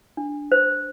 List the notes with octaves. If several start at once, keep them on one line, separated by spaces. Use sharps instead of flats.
D4
C5